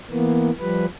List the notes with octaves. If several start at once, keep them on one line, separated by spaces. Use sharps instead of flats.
E3 A#3 B3
F3 G3 B4